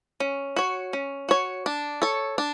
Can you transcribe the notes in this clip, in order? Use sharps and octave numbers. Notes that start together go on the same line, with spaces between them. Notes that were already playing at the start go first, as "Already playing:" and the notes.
C#4
F#4 C#5
C#4
F#4 C#5
D4
A4 C#5
D4